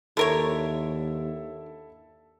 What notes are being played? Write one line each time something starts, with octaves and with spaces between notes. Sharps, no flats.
D#2 D3 E4 A4 A#4 C#5 E5